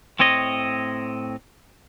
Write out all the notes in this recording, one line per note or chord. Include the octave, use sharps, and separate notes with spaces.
A2 C4 C#5 D#5